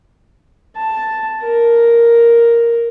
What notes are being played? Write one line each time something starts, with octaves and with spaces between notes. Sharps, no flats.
A5
A#4